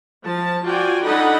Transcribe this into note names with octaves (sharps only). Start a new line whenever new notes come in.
F3 A5
F4 F#4 D5 G5 G#5
D4 D#4 A4 D#5 F#5 B5